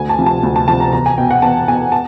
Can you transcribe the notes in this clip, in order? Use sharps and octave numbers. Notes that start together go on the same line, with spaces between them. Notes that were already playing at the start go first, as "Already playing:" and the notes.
Already playing: D2 G#5
A5
C3 F3
A5
D2
A5
C3 F3 A5
A#5
E2 A#5
G#5
B2 G5
F#5
E2 A5
B2 G#5
A5